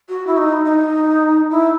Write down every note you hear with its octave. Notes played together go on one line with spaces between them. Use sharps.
F#4
E4
D#4
D#4
E4